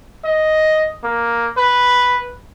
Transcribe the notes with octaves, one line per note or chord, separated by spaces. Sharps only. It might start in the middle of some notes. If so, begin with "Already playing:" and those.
D#5
A#3
B4